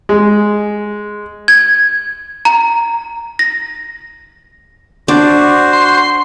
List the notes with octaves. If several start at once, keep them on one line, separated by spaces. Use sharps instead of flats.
G#3
G#6
A#5
A#6
D4 F#4 C5
C6